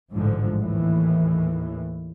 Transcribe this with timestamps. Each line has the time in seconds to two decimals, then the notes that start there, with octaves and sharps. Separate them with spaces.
0.12 A1 G#2 D3 F3
0.60 D#2 A2 E3